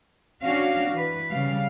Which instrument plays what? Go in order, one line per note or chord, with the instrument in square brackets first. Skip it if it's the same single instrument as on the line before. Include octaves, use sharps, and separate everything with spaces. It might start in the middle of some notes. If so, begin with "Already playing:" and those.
[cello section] C#4 D4 F#4 F5
E3 B4
C#3 G3 F5